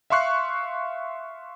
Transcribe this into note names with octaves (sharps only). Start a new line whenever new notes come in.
E5 F5 C6 C#6 F#6 C7